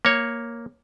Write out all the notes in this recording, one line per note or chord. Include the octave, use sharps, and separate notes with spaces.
A#3 C#5